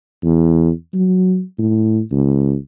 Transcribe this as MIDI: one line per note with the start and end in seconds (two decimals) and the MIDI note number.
0.23 0.70 40
0.93 1.43 54
1.58 2.01 45
2.11 2.55 37